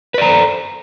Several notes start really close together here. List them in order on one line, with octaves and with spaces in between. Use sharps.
B4 D5 A#5 C5 A4